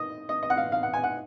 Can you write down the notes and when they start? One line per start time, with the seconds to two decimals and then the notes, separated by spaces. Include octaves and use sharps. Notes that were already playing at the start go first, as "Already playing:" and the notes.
Already playing: D#3 D#5
0.29 D#5
0.43 D#5
0.50 F#5
0.57 F5
0.72 F5
0.83 F#5
0.94 G#5
1.04 F#5